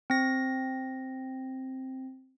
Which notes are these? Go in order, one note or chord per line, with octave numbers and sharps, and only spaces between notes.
C4 A#6